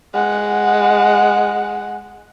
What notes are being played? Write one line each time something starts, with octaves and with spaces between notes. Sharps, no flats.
G#3 F#5